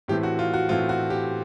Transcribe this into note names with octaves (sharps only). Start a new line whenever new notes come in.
A2 E3 A3 C4 G4
F#4
F4
F#4
A2 E3 A3 C4 F4
F#4
G4